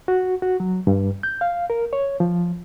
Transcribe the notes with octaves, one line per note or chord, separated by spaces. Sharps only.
F#4
F#4
F#3
G2
G6
F5
A#4
C#5
F3